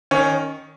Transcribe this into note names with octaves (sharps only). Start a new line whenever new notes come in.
D#3 C#4